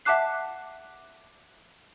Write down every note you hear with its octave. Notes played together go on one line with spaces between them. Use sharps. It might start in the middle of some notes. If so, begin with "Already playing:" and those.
E5 F#5 A5 D6 F#6 C7